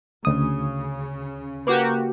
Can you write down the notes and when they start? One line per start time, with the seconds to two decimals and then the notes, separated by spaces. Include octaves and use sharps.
0.25 D2 C#3 D#6
1.67 A#3 F#4 G4 B4 D6